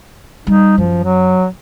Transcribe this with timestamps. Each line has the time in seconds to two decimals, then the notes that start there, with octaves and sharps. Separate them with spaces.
0.47 G3 D#4
0.78 F#2 F3
1.04 F#3